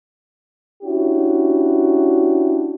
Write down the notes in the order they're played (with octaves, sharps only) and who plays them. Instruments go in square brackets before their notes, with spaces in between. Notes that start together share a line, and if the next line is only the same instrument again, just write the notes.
[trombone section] C#4 D4 E4 F#4 G4